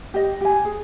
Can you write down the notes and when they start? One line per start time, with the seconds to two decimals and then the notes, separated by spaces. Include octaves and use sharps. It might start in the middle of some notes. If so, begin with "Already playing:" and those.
0.14 G4 D#5
0.41 G4 G#5
0.65 G#4